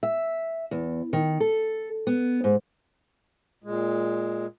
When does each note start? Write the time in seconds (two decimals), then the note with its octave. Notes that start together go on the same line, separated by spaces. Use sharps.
0.03 E5
0.71 E2
1.13 D#3
1.40 A4
2.07 B3
2.44 G#2
3.64 A#2 G#3